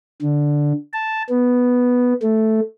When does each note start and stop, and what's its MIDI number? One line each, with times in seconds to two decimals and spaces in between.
0.22 0.73 50
0.93 1.23 81
1.29 2.14 59
2.22 2.60 57